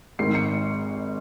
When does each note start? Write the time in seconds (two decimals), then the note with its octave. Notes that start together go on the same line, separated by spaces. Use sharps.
0.19 G#1 G#2 D#3 C7
0.35 C#7